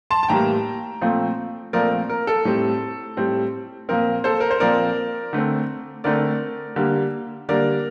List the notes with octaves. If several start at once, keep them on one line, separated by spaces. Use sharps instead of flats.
A5 C6
A5
A2 E3 G3 A#3 G5 A#5
A#2 F3 A3 C4
A#2 F3 A3 C4 A#4 D5
A#4
A4
A2 G3 C4
A2 G3 C4
A#2 F3 C4 A#4
A4 C5
A#4
C5
A#2 F3 C4 A#4 D5
D3 A3 C4
D3 A3 C4 A#4 D5
D3 G3 A#3
D3 G3 A#3 A#4 D5